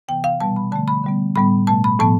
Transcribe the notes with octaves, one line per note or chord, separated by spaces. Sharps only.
C3 E3 B3 G5
F5
B2 G3 B3 A5
B5
D3 F3 A3 A5
B5
D3 G3 B3
A2 G3 B3 B5
B2 A3 A5
B5
A2 F3 B3 A5